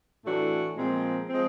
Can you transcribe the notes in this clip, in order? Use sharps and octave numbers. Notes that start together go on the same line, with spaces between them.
A2 E3 A3 D4 F#4
A#2 F3 G#3 C4
F3 G#3 C4